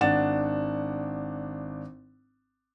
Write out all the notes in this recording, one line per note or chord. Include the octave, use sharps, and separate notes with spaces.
G#1 D4 F#5 A6 E7